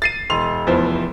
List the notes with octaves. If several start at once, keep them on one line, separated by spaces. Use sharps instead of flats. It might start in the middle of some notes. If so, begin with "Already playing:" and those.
A6 C7 D#7
E1 C6 F7
F1 E2 F3 C5